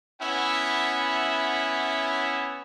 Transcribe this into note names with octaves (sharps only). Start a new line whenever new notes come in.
B3 C#4 E4 E5 F#5